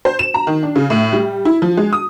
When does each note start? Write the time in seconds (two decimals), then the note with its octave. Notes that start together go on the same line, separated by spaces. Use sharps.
0.05 C5
0.19 E7
0.34 A#5
0.47 D#3
0.63 D4
0.76 C#3
0.90 A2
1.13 G3
1.45 E4
1.62 F3
1.77 G#3
1.93 D#6